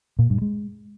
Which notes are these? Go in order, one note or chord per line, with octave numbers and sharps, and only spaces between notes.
A#2
G2
G#3